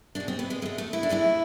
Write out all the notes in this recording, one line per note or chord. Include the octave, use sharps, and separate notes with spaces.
B2 G#3 D4
C4
B3
G#3
B2 G#3 A3
A3
E4
D4
A2 E3 G#3 E4